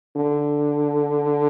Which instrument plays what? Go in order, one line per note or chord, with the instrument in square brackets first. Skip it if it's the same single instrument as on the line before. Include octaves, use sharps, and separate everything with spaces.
[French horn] D3